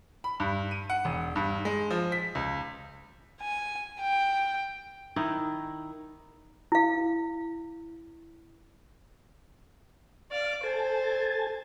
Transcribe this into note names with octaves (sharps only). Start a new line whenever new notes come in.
B5
G2
D#7
F#5
E1
G2
G#3
F3
B6
C#2
G#5
G5
D#3 D#4 E4
E4 F5
D5 F5
A4 C5 G#5 A5